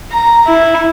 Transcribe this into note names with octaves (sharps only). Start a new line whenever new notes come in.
A#5
E4